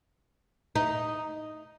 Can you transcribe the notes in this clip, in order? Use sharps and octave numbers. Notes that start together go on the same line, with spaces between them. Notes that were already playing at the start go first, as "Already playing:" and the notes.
D#4